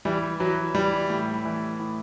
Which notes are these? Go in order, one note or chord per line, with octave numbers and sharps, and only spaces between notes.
E3 G3
E3 F#3
E3 G3
A2
E3
A2